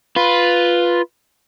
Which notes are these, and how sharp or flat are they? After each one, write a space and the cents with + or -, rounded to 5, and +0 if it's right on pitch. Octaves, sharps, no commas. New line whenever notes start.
F4 +0 B4 +0